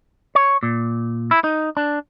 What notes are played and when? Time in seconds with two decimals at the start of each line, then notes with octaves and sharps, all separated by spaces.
0.35 C#5
0.63 A#2
1.31 E4
1.44 D#4
1.77 D4